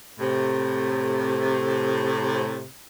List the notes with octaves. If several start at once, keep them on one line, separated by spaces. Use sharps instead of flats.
A2 C3